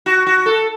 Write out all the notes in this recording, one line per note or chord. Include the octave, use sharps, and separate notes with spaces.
F#4
F#4
A4